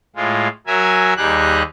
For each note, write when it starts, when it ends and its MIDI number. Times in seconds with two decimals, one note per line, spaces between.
0.16 0.48 45
0.16 0.48 56
0.16 0.48 65
0.67 1.14 54
0.67 1.14 70
0.67 1.14 76
0.67 1.14 80
1.17 1.63 39
1.17 1.63 55
1.17 1.63 63
1.17 1.63 67
1.17 1.63 68
1.17 1.63 90